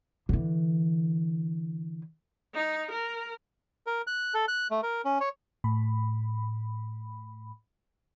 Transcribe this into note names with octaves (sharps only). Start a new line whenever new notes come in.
D3 E3
D#4
A#4
A#4
F#6
A4
F#6
A3
A#4
C#4
C#5
A2 B5